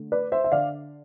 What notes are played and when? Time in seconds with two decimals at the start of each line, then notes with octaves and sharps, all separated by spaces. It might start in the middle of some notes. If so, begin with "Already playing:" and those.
Already playing: D3 A3
0.12 B4 D5
0.32 C5 E5
0.44 E5
0.52 D3 D5 F5